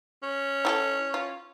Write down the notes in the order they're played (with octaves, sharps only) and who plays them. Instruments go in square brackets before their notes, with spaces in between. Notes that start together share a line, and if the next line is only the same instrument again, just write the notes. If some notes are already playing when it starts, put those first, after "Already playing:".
[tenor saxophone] C#4
[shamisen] E4 G4 A4
F4